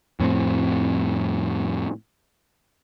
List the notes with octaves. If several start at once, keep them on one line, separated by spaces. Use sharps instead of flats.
F2 A2 B3 C4